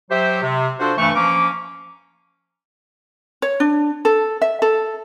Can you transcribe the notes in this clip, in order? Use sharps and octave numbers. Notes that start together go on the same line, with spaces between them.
F#3 G4 C5 E5
C3
D4 F4 F#4 A4 C5
G2 E3 A3 C#6
F3 A#3 C#4 F5 A#5 D6
C#5
D4
A4
E5
A4